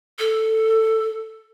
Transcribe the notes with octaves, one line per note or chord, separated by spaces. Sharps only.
A4